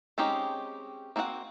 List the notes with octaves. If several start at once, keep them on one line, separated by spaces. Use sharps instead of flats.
G#3 C4 C#4 D#4 G4
A#3 C4 F#4 A4 F#5